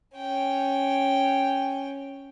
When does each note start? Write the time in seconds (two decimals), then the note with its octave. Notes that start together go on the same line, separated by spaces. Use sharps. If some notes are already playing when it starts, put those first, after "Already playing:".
0.16 C#4 G5